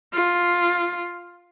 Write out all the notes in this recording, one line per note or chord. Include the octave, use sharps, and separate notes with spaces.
F4